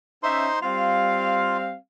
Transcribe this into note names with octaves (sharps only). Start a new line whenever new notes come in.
C#4 D#4 C5 E5 C6
G3 C4 F4 F5